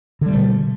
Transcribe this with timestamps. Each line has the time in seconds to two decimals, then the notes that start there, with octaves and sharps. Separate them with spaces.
0.21 D3
0.26 G3
0.31 A3
0.35 B2